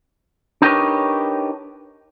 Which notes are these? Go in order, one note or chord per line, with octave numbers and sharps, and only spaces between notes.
D4 D#4 G4 A#4 B4 C#5